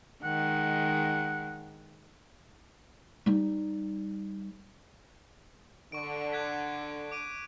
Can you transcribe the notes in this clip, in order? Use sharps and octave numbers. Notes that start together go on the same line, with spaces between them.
D#3 G#3 F#5
G3 D#4
D3 C#6 D7
F#6 G#6 B6
D6 D7 D#7